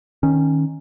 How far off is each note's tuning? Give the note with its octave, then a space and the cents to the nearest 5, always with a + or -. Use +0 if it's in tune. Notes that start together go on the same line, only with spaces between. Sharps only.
D#3 +0 C#4 -10